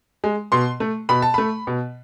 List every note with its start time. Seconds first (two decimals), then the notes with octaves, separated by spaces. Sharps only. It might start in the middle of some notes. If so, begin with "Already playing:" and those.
0.24 G#3
0.52 B2 C6
0.80 A3
1.09 B2 B5
1.22 A5
1.34 A3 B5
1.67 B2